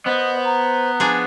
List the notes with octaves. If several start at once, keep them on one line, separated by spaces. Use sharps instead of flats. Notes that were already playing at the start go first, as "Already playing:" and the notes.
B3 C5 D#5
A#5
F3 D4 G#4 G#5